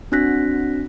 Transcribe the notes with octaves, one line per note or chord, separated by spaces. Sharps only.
C4 D4 F#4 F#6 A#6 B6